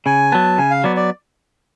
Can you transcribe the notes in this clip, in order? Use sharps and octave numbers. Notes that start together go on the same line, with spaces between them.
C#3 G#5
F#3 B3 A5
C#3 G#5
F5
F#3 B3 D5
D5